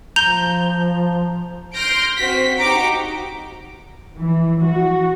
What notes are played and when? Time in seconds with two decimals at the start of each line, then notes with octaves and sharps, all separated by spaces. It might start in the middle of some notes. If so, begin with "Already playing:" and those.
0.16 F3 A#5 G6 F7
1.73 C6 F6 G6 A#6 D7
2.17 C4 F#4 B6
2.59 D#4 F#4 G4 A#5 D6 D7
4.18 E3
4.65 F#4